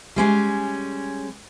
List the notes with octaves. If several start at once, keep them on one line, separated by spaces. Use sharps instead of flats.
G3 G#3 C#4